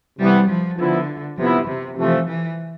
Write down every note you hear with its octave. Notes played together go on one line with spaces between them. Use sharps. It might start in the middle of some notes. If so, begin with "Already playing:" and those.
C3 E3 G3 B3
F3
D3 F3 B3 E4
C3 F3 B3 E4
C3
C3 E3 F3 A3
E3